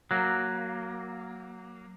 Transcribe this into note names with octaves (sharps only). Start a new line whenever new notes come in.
F#3 A#3